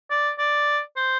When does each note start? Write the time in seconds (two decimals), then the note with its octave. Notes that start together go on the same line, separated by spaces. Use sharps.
0.10 D5
0.39 D5
0.96 C5